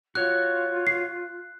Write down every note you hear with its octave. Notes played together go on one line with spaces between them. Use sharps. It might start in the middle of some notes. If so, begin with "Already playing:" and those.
F4 F#4 C#5 F#6
C7